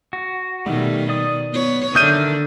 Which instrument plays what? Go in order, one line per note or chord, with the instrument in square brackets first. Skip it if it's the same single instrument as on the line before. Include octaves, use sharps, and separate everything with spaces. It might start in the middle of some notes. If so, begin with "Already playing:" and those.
[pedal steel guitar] F#4
[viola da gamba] B2 D#3 [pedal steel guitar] G3 A3
[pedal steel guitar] D5 D#6
[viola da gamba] B3 C#5
[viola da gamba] D3 D4 [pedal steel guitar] D#3 E5 F6 [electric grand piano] D#6 G6 D#7